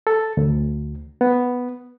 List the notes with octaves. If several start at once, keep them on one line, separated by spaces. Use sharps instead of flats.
A4
D2
B3